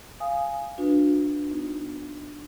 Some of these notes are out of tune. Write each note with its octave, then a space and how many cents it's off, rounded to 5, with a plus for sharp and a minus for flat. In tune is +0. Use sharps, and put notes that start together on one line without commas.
F5 -10 G#5 +0 D#6 +0
D4 +5 F#4 -40 B4 +0
B3 +0 D#4 +0